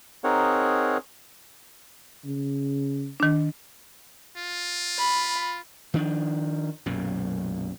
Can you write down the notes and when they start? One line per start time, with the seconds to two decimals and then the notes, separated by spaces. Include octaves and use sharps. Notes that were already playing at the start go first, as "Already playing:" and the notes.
0.24 C4 D#4 G#4 A#4 C#5 F#5
2.25 C#3
3.20 D#3 D4
4.37 F4
4.98 B5
5.94 D#3 F3 D4
6.86 B1 F#2 A#2